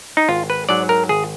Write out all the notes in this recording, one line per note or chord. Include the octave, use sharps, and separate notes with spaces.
D#4
G#1 F4
B4
G#2 F#3 D5
A#4
G#1 G#4